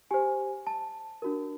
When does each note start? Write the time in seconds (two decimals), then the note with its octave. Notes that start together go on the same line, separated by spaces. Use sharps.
0.11 G4 C5 G#5
0.67 A5
1.22 D4 F#4 A#4